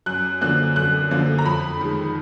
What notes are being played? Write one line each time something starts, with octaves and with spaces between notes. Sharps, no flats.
F#2 F#6
D3 F3 A#3 F#6
F#2 F#6
D3 F3 A#3
A#5
F2 B5
D#3 G#3